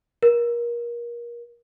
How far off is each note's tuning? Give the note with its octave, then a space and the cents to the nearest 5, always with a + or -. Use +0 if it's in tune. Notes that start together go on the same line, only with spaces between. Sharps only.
A#4 +25